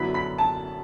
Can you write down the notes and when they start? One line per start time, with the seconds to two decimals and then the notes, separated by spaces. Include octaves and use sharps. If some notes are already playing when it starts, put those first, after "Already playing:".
Already playing: F#2 D3 F#3 B3 E4 B5 B6
0.14 B5 B6
0.38 A5